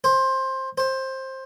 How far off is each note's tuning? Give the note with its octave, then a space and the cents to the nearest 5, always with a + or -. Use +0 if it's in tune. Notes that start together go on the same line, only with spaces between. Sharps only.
C5 +15
C5 +15